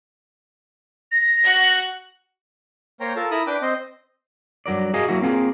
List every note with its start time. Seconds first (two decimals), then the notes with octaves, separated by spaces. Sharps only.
1.12 A#6
1.44 F#4 F#6
3.00 A#3 C5 C#5 G5 A#5
3.16 F4 A4 A#4 A5
3.31 E4 A#4 B5 D#6 E6
3.47 D4 B4 G5 D6
3.62 C4 C5 D#5
4.66 G2 F#3 A#4 D5
4.94 F#4 G#4 A#4 D#5 F5 G#5
5.08 F#3 A#3 E4 F#4
5.22 A#3 C4 F4 G#4 A#4